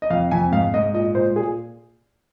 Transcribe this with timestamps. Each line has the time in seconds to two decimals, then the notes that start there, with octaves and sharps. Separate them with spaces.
0.02 D#5
0.10 F2 F5
0.31 F2 G#5
0.52 G#2 F5
0.74 G#2 D#5
0.94 A#2 D#5
1.15 A#2 C5
1.36 A#2 G#4